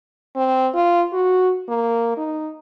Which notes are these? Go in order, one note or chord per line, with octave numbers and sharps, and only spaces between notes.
C4
F4
F#4
A#3
D#4